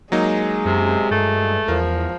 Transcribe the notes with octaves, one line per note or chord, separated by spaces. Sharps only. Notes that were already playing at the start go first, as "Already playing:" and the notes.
F#3 G#3 A#3 D#4
F#2 C3
G2 A3
E2 F3 A#4